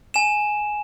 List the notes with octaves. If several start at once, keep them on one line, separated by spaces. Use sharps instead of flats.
G#5 E7